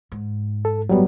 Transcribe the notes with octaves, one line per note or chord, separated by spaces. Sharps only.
G#2
A4
G1 A2 F#3 G3 B3